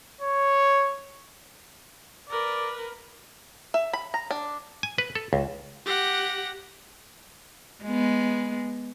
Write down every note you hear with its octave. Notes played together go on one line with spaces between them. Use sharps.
C#5
A#4 B4 D5
E5
B5
A#5
D4
G#5
B4
A4
C#2
G4 F#5 A#6 D7
G#3 B3